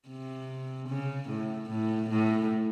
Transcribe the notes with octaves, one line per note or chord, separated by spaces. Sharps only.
C3
C#3
A2
A2
A2